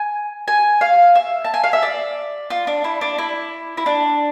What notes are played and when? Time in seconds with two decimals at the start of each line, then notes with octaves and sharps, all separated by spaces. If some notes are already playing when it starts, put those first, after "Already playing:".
Already playing: G#5
0.48 G#5
0.81 F5
1.15 E5
1.45 A5
1.54 G#5
1.64 F5
1.73 E5
1.83 D5
2.50 F4
2.67 D4
2.84 E4
3.01 D4
3.18 E4
3.77 E4
3.86 D4